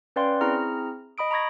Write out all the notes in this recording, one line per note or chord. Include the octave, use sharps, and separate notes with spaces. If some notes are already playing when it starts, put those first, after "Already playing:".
C#4 B4 D5 F5 G5 C6
C4 E4 G#4 A#5 F6
D#5 B5 D#6 D7
A#5 B5 C#6 G#6 A#6